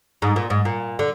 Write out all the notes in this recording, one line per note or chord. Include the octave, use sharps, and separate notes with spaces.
G#2
A#2
G#2
A#2
D3